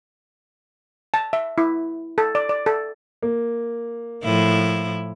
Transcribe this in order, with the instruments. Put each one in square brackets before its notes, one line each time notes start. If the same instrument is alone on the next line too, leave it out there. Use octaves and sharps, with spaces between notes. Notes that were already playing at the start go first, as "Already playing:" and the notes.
[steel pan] A5
E5
E4
A4
D5
D5
A4
[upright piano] A#3
[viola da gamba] A2 F3 E4